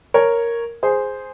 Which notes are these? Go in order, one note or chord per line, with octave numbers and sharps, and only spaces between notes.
A#4 C#5
G#4 C5